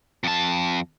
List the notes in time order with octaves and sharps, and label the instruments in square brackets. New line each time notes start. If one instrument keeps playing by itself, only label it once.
[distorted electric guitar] F2 A5